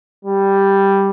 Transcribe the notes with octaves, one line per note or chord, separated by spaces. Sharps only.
G3